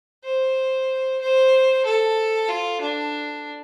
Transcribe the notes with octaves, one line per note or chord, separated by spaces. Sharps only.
C5
C5
A4
F4
D4